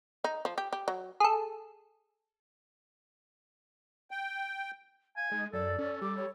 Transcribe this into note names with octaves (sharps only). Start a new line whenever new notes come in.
D#4
F3
G4
G4
F#3
G#4 A4
G5
F5 G#5
G#3 D#4
F#2 A4 D5
C#4 A4
G3 D6
C#5